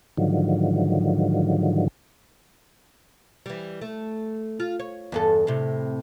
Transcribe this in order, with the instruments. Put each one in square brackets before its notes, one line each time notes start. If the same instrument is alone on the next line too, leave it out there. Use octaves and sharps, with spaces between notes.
[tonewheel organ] G#2 D3 D#3 F3 F#3
[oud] E3 G3
A3
F4
C#5
E2 G2 A4
A2 C3